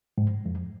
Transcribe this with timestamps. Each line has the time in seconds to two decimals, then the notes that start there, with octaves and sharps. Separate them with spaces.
0.18 G#2
0.46 F2